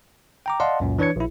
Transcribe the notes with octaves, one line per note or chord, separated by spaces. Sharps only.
G5 A#5 D6
D5 D#5 F5 F#5 A5 C6
C#2 F#2 A#2
E3 D4 B4 C#5 G#6 C#7
A#1 E4